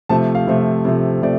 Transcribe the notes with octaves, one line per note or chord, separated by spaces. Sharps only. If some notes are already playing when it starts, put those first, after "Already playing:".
C3 F3 A3 A5
F5
C3 F3 A3
C3 F3 A3
C3 F3 A3 D5